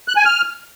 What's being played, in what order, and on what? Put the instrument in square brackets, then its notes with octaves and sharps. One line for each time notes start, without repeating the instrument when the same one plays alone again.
[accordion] F#6
G#5
F6